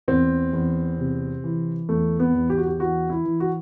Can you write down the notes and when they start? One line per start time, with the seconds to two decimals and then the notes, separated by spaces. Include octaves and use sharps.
0.08 E2 C4
0.53 E2
0.98 C3
1.44 E3
1.89 E2 A3
2.19 B3
2.34 E2
2.50 G4
2.58 F#4
2.66 G4
2.79 E3 F#4
3.10 E4
3.25 E3
3.40 F#4